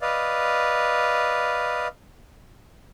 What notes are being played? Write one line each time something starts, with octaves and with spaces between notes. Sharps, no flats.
B4 D5 D#5 F5